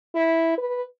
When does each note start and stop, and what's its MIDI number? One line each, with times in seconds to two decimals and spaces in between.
0.15 0.55 64
0.58 0.83 71